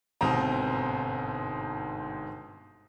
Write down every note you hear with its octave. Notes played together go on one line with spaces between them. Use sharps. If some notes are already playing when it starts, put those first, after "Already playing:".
G1 G#2 B2 C4 A#5